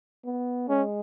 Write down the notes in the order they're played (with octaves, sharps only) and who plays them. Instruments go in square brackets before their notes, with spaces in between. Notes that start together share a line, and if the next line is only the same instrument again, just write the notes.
[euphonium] B3
[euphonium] G#3 [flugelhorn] C#4